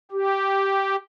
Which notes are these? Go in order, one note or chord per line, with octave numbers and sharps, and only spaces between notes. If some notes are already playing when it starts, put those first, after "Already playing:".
G4